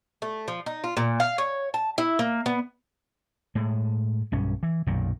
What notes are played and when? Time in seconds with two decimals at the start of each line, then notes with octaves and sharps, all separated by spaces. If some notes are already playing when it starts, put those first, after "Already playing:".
0.22 A3
0.48 F3
0.66 D#4
0.84 F4
0.97 A#2
1.20 F5
1.38 C#5
1.74 A5
1.98 E4
2.19 A#3
2.46 B3
3.55 A2 G#3
4.32 B1 G2 C#4
4.63 E3
4.86 B1 F#2 A#2 D#3